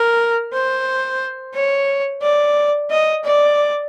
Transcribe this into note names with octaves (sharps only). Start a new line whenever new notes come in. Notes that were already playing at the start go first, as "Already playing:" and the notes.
Already playing: A#4
C5
C#5
D5
D#5
D5